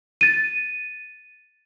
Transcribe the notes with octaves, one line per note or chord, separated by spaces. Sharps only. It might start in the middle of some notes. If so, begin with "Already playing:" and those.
A6 D#7